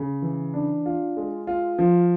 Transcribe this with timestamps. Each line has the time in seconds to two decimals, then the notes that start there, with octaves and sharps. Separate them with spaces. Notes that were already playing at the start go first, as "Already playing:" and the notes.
Already playing: C#3
0.22 E3
0.54 D4
0.86 F4
1.17 G#3
1.47 F4
1.78 F3